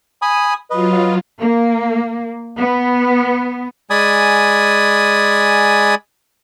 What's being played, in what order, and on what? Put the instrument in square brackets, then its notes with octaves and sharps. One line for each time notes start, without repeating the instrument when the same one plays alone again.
[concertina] G#5 B5 D#6
[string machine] F#3 F4 [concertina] B4 D#5
[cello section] A#3
B3
[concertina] G#3 D5 G#5 B5 D#6